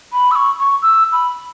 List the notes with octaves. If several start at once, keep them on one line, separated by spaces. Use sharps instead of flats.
B5
E6
C#6
C#6
E6
B5